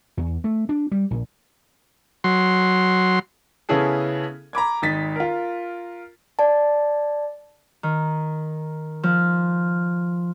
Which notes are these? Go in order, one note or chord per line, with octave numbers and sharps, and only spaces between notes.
E2
A3
D4
G3
A#1
F#3 C6
C#3 B3 C#4 E4 G#4 A4
A#5 B5 D6 G#6
G#1 D#4 A6 B6
F4 A#4
D5 A5
D#3
F3